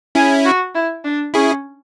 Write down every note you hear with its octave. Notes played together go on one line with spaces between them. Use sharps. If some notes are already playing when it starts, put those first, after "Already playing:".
C#4 E4 G#4
F#4
E4
D4
C#4 E4 G#4